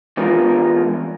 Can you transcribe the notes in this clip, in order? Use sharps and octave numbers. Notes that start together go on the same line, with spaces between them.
E3 G#3 B3 D4 F4 A#4